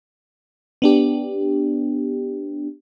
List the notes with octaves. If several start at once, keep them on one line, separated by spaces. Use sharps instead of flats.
B3 D4 G4